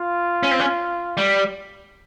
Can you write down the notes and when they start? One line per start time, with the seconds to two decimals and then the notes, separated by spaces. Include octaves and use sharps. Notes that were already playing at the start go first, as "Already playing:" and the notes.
Already playing: F4
0.43 C#4
0.51 C4
0.60 C#4
1.17 G3